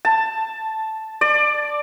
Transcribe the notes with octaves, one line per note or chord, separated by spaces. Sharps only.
A5
D5